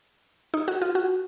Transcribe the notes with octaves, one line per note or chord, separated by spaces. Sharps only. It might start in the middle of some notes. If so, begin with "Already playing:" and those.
D#4
F#4
F4
F#4